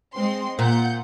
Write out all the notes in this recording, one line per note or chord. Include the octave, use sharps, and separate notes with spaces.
G#3 C4 C6
A#2 F#5 G6